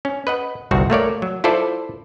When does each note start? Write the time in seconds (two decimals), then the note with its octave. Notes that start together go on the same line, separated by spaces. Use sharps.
0.05 C#4
0.27 B4 D#5 F#5
0.71 G1 C2 C4 F#4
0.90 A3 A#3 C#5 D5
1.22 F#3
1.44 E4 F4 A4 C5 D5